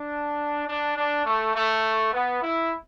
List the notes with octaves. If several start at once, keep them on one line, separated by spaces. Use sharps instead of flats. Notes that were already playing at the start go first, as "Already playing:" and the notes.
Already playing: D4
D4
D4
A3
A3
B3
E4